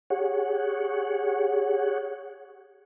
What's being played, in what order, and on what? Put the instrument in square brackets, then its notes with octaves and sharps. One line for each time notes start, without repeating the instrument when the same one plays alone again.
[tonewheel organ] G4 G#4 C#5 F#5